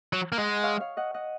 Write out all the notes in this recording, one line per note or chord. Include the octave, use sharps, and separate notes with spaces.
F#3
A#3
G#3 D#5 F#5
C#5 F5
C#5 F5
D#5 F#5
D#5 F#5